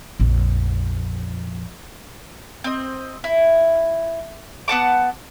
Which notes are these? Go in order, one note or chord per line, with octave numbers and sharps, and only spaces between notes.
A#1 F2
C4 D#5
E4
B3 F#5 A5 D6